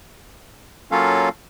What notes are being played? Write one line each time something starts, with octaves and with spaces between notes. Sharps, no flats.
F#3 A#3 C#4 F4 A4 F5